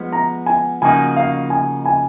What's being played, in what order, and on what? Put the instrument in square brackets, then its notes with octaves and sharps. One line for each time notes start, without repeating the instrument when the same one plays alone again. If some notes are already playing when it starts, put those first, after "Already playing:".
Already playing: [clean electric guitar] F3 G#3 B3
[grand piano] A#5
G#5
[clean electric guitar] C#3 F3 A#3 D#4 F#4 [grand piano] G#5
[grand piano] F5
G#5
G#5